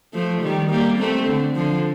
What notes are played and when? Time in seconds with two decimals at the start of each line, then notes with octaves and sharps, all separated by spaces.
0.13 F3 A3
0.42 D#3 G3
0.71 G3 A#3
0.99 A3 C4
1.27 D3
1.56 D3 F3